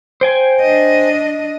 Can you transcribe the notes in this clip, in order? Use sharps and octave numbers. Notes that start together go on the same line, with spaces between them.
C5 G5 G#5
D4 D#5